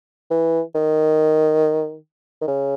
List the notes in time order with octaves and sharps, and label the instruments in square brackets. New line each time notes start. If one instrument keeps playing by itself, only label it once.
[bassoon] E3
D#3
D#3
C#3